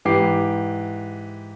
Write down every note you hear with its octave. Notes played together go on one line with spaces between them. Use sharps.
G#2 E3 G4 D6 C7